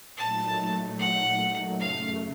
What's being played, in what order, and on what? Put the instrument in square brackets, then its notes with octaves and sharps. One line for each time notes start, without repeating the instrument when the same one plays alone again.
[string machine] A#2 F#3 A3 D#4 [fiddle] A5
[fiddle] F#5
[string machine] F#2 C#3 A3 [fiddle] F5